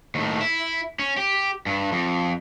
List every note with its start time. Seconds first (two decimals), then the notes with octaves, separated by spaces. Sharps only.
0.15 D#2 A2
0.41 E4
0.99 C#4
1.18 G4
1.66 G2
1.92 F2